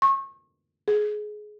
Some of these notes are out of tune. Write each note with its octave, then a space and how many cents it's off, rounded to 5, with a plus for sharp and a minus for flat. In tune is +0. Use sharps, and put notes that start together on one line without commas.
C#6 -30
G#4 +20